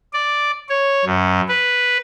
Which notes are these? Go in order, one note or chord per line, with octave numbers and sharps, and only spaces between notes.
D5
C#5
F#2
B4